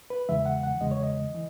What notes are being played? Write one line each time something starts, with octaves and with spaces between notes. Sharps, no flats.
B4
E2 C#3 E3 G#3 E5
F#5
F#5
E2 C#3 E3 G#3 D#5
C#5
D#5
E3